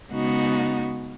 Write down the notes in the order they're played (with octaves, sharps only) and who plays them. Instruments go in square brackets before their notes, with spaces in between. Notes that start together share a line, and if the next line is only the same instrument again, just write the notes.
[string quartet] C#3 G#3 B3 D#4 F#4